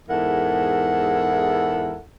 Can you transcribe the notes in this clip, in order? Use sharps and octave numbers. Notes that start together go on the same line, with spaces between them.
E2 G#2 E4 A4 A#4 F#5